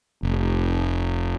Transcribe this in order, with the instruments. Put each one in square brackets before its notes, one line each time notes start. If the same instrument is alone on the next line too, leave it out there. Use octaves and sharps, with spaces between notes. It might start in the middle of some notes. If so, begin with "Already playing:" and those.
[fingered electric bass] F1